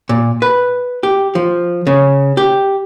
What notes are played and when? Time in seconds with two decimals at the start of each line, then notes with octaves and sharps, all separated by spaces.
0.09 A#2
0.42 B4
1.03 G4
1.35 F3
1.87 C#3
2.37 G4